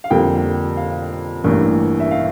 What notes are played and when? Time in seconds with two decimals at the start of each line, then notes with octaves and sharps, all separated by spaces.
0.04 F5
0.10 F2 D3 G3 A#3 G5
0.77 F5
1.44 A1 G2 E3 A#3
2.00 E5
2.11 F5